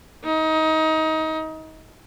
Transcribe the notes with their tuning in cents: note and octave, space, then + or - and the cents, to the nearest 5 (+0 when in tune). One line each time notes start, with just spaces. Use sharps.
D#4 +25